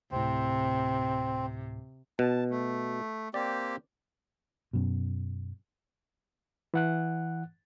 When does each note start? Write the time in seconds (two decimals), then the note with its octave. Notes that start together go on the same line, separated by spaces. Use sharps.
0.11 D2 A2 C3 C4
2.19 B2 A5
2.50 A3
3.34 A#3 C4 G4 D5
4.73 F#2 B2
6.74 E3 F#5 F#6